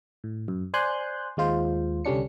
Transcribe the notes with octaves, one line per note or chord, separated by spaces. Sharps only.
A2
F#2
C5 D5 G#5 C6 F#6 G6
D#2 G#3 F4 C5
C2 D3 G3 C#4 D4 C#7